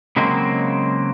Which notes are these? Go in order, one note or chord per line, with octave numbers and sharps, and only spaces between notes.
C#3 F#3 G#3 A#3 C4